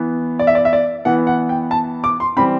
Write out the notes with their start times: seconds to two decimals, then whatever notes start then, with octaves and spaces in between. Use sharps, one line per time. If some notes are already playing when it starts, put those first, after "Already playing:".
Already playing: E3 B3
0.39 D5
0.47 E5
0.55 D5
0.65 E5
0.73 D5
1.05 E3 B3 F#5
1.27 F#5
1.49 G5
1.71 A5
2.04 D6
2.20 C6
2.37 E3 G3 C4 B5